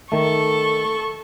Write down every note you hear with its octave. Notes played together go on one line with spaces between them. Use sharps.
D#3 A3 A4 C#6